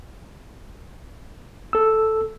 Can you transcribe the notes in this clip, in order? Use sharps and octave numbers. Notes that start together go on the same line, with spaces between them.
A4 E6